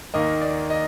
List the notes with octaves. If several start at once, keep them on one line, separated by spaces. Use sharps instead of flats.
D#2 D#3 A#3 D#5
D5
D#5